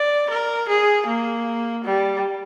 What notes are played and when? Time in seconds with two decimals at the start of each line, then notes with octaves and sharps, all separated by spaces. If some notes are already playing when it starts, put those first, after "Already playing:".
Already playing: D5
0.30 A#4
0.69 G#4
1.06 A#3
1.85 G3